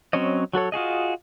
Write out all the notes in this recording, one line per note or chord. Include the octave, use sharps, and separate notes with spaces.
F#3 C4 C#4 C#5 D#5
F#3 F#4 A4 C#5
F4 F#4 G#4 D#5